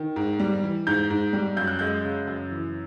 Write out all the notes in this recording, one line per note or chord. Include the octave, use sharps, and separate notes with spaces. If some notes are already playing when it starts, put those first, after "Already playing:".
Already playing: D#3
G#2
G3
E3
G#2 G6
G#2
G3
F#2 G6
F#6
G#3 G6
C#3
F#2
E3